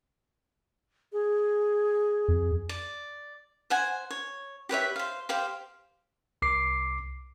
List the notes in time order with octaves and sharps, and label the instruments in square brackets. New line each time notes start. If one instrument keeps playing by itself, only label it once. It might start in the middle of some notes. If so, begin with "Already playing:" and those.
[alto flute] G#4
[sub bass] F2
[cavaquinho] D5
C5 F#5 G#5
C#5
G4 B4 C#5 E5
C5 F5
G4 C5 F5 G5
[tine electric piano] C2 D6 C7